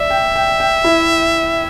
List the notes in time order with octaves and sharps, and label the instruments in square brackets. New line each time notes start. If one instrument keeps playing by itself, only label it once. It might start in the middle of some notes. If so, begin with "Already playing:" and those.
Already playing: [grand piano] D5 [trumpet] E5
[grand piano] G5
G5
G5
E4